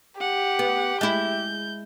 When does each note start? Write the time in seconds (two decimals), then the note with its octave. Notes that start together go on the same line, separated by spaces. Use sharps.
0.21 G4 F#5
0.59 B3
1.01 G#3 E4 G6